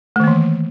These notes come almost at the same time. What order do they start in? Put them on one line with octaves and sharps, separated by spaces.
A3 D#3 A#3 E3